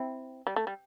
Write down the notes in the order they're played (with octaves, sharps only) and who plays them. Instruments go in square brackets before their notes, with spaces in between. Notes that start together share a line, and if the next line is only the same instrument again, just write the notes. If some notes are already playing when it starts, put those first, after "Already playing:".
Already playing: [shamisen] C4 E4
G3
A3
G3